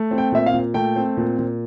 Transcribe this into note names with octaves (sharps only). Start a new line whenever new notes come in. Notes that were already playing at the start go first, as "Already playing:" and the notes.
Already playing: A3
C4
G5
A#2 E5
F5
A#2
A3 G5
C4
A#2
A#2